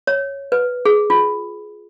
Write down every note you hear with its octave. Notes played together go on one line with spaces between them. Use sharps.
C#5
B4
G#4
F4